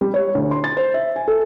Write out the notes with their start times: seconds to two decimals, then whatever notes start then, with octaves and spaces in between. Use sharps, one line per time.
0.01 G3
0.14 C#5
0.35 D2
0.51 C6
0.64 A6
0.77 C5
0.94 E5
1.16 G#5
1.28 A4